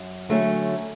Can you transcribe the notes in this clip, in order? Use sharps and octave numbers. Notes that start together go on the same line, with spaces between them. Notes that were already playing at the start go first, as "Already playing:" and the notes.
Already playing: F#2
D3 F#3 A3 C#4